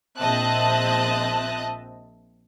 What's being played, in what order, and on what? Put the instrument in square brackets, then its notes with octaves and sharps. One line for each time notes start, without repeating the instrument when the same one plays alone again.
[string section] A#1 C4 D#5 E5 A5 F#6